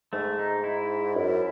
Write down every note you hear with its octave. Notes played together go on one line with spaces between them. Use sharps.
G#2 A3
D#4
E4
F#2